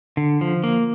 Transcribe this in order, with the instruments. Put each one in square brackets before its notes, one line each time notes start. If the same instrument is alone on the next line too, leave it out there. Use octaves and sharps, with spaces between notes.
[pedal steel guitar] D3
F3
A#3